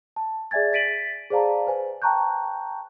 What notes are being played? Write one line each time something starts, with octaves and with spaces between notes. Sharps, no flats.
A5
G#4 D5 E5 G#5 G#6 A6
A6 B6 D7 D#7 F#7
G#4 C5 D5 F5 A5 A#5
B4 C5 G#5
G5 A5 A#5 C#6 F#6 G6